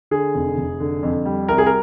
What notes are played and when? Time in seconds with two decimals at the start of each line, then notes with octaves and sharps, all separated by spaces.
0.11 D3 G#4
0.35 F1
0.57 F1
0.80 D3
1.03 F2
1.25 G3
1.48 C2 A#4
1.58 G#4
1.66 A#4